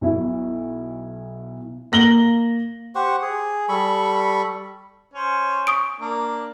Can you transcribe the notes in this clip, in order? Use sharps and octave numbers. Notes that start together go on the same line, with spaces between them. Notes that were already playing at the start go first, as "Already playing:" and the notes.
B1 B2 E4
A#3 A#6 F#7 G7
G4 C5 F#5 C#6
G#4
G3 A4 B5 C#6
C#4 C5 C#5
C#6 D#6 D7
A#3 D4